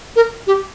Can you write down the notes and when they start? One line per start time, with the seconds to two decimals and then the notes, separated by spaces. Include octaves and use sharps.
0.16 A#4
0.47 G4